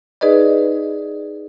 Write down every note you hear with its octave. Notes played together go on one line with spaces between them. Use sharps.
D#4 G#4 B4 D5 D#5